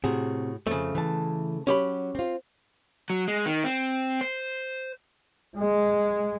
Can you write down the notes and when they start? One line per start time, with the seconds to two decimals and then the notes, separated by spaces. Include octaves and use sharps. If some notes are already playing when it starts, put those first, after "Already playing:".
0.04 A2 C3 F#4 G#4
0.67 F2 C#3 A3
0.95 E3 A5
1.67 F#3 C#4 G4 B5
2.15 C4 F4
3.10 F#3
3.28 G#3
3.46 D#3
3.64 C4
4.21 C5
5.56 G#3